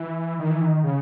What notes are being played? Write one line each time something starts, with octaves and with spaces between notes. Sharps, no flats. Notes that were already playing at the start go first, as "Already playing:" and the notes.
Already playing: E3
D#3
E3
D#3
C#3